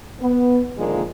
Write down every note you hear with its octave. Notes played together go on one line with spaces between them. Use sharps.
B3
A#2 D3 D#3 F3 G#3 A#3